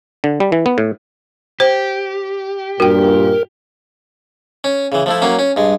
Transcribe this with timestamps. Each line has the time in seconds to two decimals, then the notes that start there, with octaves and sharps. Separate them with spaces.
0.24 D3
0.40 G3
0.52 E3
0.66 B3
0.78 A2
1.60 G4 C5
2.80 G2 A#2 F#4 A#4 G5
4.64 C#4
4.92 C#3 E3
5.06 F3 A3 E4
5.22 F#3 A#3 C#4
5.39 C#4
5.57 G2 G#3